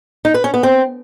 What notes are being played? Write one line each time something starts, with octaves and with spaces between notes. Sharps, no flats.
D#4
B4
C#4
B3
C4